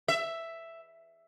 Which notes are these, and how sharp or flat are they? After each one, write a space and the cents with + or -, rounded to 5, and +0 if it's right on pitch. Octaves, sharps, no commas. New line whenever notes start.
E5 +5